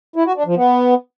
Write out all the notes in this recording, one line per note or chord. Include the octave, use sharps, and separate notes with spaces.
E4
F#4
D4
F3
B3